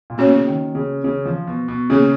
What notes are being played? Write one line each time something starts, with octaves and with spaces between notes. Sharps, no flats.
A#2
B2 A#3 C#4 F#4 C#5
C#3
D#3
C#3
C#3
F3
B2
B2
C#3 A#3 C#4 G#4